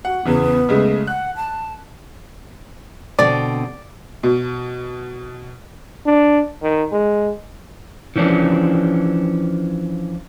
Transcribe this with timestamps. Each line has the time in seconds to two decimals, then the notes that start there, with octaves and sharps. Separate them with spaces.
0.05 F#4 F#5
0.25 E2 C#3 E3 B3
0.69 C#3 G#3 A3
1.07 F#5 F#6
1.36 A5
3.19 B2 D3 C4 D5
4.23 B2
6.06 D4
6.62 D#3
6.92 G#3
8.16 E3 F3 C#4 D4